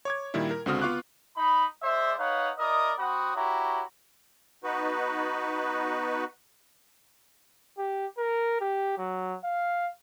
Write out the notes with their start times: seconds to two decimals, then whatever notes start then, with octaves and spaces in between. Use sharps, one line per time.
0.05 C#5 D6 G#6
0.34 A#2 D#3 G3 E4
0.51 A#4
0.66 C#2 D3 C4 F#4 D#6 F6
0.81 B3 F4 F5 C#6 D6 F#6
1.36 D#4 B5
1.83 G#3 C5 D5 E5
2.18 D#4 B4 C#5 F5 F#5
2.59 E4 A#4 D5 D#5 D#6
2.97 C4 F#4 F#5 B5 D#6
3.35 E4 F#4 G4 C#5 A#5
4.64 B3 D#4 F#4 B4
7.78 G4
8.18 A#4
8.61 G4
8.98 F#3
9.44 F5